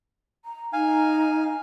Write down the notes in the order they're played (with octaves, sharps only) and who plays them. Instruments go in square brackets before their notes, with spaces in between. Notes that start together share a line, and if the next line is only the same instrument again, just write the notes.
[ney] A#5
[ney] D#4 [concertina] F5 G#5